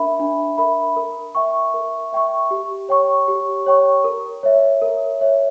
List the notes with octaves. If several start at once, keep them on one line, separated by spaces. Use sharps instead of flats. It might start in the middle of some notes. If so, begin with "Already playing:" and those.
Already playing: D4 A#4 E5 B5
D4
A#4 E5 B5
A#4
E5 G5 C#6
A#4
E5 G5 C#6
G4
C#5 G5 C#6
G4
C#5 G5 C#6
A#4
C#5 E5
A#4
C#5 E5